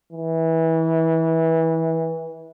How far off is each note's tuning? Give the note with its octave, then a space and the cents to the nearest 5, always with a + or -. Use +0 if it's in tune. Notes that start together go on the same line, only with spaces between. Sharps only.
E3 -20